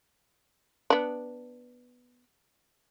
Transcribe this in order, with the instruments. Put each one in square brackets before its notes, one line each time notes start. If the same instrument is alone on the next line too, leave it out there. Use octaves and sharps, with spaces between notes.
[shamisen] B3 D4